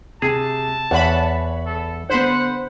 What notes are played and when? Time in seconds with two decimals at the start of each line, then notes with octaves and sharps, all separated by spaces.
0.22 C3 G#4 A5
0.91 E2 C#5 F#5 B5
1.66 A4
2.10 D3 B3 C5 F#5 B5